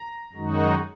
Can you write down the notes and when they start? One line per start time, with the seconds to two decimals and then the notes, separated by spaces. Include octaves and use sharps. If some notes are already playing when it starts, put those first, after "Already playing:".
Already playing: A#5
0.33 F#2 D#3 G#3 D#4 F#4